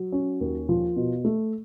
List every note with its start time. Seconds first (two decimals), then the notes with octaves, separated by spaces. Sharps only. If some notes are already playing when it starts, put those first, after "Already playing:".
Already playing: F#3
0.12 C#4
0.41 D#2
0.69 F3
0.96 B2
1.25 A3